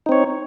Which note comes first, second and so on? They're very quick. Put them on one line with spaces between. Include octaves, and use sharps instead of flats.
D#4 C4 C#5